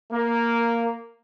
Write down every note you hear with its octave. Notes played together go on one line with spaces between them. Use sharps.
A#3